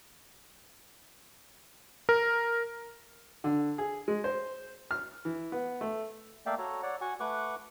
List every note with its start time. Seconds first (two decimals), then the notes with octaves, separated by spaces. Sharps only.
2.09 A#4
3.44 D3
3.78 G#4
4.08 G#3
4.24 C5
4.91 F6
5.25 E3
5.52 B3
5.81 A3
6.46 A3 A#3 D5 E5 F5 G5
6.58 F#4 A4 C#5 A#5
6.82 C#5 D5 F#5
7.01 F#4 F#5 G#5 C#6
7.20 A3 B4 F#5 C#6 D6 F#6